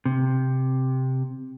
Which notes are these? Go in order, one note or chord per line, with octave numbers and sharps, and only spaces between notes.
C3